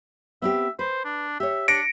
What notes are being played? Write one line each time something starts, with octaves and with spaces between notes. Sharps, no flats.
B3 C4 G4 E5
B4 C5
D4
G4 C#5 E5
D4 A#6 C#7 D7